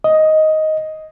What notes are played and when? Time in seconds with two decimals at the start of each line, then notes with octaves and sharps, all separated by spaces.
0.04 D#5